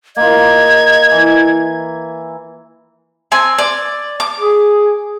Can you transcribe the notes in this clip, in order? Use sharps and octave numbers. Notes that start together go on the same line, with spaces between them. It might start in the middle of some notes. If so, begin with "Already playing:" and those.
A#3 F4 D#5 G#6
E3
C4 G#5
D5
D6
G#4